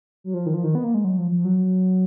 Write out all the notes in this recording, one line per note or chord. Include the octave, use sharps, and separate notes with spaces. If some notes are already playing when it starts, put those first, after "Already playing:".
F#3
F3
D#3
F3
D#3
B3
A#3
G#3
F#3
F3
F3
F#3